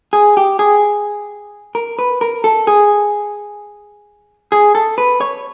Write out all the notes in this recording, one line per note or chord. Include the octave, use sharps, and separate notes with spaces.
G#4
G4
G#4
A#4
B4
A#4
A4
G#4
G#4
A4
B4
C#5